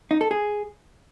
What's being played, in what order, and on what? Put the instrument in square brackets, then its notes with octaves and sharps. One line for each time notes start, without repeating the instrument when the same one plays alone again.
[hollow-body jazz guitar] D#4
A4
G#4